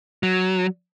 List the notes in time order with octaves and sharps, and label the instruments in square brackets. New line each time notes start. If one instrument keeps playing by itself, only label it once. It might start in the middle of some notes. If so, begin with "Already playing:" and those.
[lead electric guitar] F#3